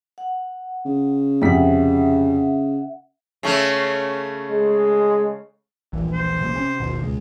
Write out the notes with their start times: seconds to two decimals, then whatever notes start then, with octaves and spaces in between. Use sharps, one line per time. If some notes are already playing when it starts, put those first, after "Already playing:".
0.18 F#5
0.86 C#3
1.42 F2 C3 E5 F#5 B6
3.43 C#3 A3 C#4
4.50 G#3
5.93 D#1 A#1 E3
6.13 C5
6.41 C3 F3 A#3
6.56 C3 C#4
6.80 G#1 D#2 B2
7.02 C#2 G#3